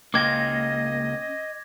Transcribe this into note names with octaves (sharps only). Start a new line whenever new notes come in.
C#2 A#3 C#4 D#5 G5 D6 G#6 A#6